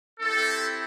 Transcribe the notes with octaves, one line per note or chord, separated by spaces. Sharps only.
C4 E4 G4 A4